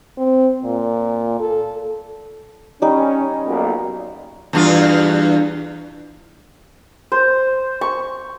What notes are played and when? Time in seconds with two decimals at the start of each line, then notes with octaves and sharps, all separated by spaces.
0.17 C4
0.63 A#2
1.40 A4
2.82 G3 C#4 D#4
3.46 B1 A#2
4.53 E2 G2 F4
7.12 C5
7.81 C#6